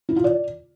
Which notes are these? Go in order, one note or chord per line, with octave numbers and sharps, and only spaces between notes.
E4
F4
D5